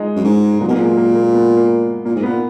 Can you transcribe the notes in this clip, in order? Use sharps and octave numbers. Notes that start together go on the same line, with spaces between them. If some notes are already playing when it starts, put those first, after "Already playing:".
Already playing: G#3 D#4
F#2
G#2
G#3
A#2 F#3
B2 A#3
A#2 G#3
A#3
A#3
B3
A#3
A#2 A#3
G#2
A#2 B3